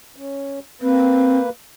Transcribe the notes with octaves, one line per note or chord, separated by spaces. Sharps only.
C#4
A#3 C4 B4